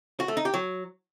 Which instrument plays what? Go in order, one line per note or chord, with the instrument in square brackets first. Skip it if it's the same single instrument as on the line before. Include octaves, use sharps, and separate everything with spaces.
[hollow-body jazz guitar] F#4
A3
D#4
G4
F#3